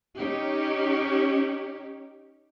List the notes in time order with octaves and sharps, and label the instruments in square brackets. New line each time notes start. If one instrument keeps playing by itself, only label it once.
[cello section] C#4 D#4 G4